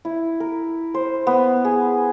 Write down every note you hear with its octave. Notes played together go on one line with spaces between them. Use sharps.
E4
A#4
C5
B3
G#4